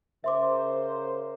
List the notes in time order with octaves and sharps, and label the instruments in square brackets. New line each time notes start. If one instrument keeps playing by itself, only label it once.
[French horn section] C#3 A#4 C5 [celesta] E5 C6 D6